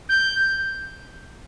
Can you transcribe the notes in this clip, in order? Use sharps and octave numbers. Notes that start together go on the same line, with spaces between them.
G6